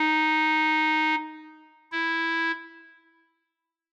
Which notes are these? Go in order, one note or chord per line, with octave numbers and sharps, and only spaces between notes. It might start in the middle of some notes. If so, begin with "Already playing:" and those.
Already playing: D#4
E4